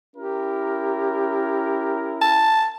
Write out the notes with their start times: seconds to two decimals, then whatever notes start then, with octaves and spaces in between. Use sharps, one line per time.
0.17 C#4 E4 G4 A#4
2.21 A5